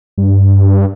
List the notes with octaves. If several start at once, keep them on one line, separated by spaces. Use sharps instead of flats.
G2